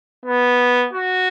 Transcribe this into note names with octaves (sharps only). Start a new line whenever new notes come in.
B3
F#4